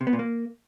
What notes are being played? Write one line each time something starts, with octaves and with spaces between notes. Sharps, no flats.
C3
B3
A#2
A#3